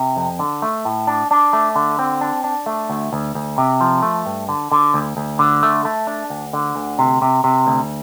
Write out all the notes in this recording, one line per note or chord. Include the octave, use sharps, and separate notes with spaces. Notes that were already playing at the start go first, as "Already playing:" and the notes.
Already playing: C3
F2
D3
A3
A2
D4
D4
A3
D3
C4
D4
D4
A3
D2
D2
D2
C3
F3
A3
G2
D3
D3
D2
D2
D3
A3
A3
D4
D2
D3
D2
C3
C3
C3
D2